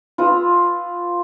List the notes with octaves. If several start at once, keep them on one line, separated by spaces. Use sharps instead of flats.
F4 B4 D#6 E6